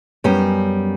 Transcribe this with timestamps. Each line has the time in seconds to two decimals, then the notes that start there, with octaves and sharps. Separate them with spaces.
0.24 F#2 G3 B3 C#4